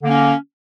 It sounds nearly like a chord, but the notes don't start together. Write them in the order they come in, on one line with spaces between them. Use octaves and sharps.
D3 A#3 C#4